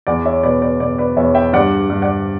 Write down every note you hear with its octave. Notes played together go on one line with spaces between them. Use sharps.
E2 D5 F#5
C#5 E5
B2 B4 D5
B4 D5
B2 B4 D5
B4 D5
E2 C#5 E5
E5 G5
G2 D5 F#5
G2
D5 F#5